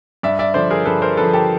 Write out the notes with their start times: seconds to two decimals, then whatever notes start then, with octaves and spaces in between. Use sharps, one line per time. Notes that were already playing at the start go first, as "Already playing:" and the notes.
0.23 G2 D5 E5
0.39 D5 E5
0.54 D3 F3 C5 D5
0.70 G#4 A#4
0.86 G2 A4 B4
1.02 A#4 C5
1.17 D3 F3 A4 B4
1.33 G4 A4